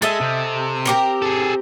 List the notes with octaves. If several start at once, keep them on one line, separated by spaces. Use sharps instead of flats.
G#3 A4 D#5 E5
C3
C4 G4 A#4
G#4 A4